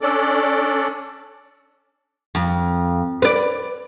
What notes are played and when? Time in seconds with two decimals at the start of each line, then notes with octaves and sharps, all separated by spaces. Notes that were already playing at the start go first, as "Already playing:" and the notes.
0.01 C#4 D4 A4 D5
2.35 F2
3.22 B4 D5